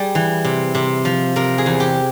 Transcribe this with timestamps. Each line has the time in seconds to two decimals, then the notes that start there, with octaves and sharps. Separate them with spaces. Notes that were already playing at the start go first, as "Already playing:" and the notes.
Already playing: G3 G#4
0.15 E3
0.44 C3
0.75 C3
1.05 F3
1.36 C3 A#4
1.58 G#4
1.66 E2
1.80 G4